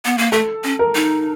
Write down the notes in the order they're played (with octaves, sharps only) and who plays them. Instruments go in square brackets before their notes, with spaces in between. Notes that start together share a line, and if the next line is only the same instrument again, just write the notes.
[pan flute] B3
A#3
[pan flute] A3 [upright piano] A4
[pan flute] C#4
[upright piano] A#4
[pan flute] D#4